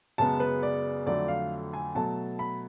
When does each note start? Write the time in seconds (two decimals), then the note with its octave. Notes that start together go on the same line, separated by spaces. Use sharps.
0.18 F#2 C#3 G#3 B3 A5
0.40 B4
0.63 D5
1.06 F2 D3 F#3 A3 D5
1.28 F5
1.73 G#5
1.95 B2 F#3 A3 A5
2.39 B5